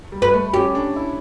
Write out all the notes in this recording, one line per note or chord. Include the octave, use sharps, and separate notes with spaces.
G3
B4
A3
C#4 G4
D4
E4